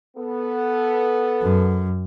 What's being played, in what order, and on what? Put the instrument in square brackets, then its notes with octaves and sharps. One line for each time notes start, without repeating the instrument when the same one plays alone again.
[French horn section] B3 A4
[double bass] F#2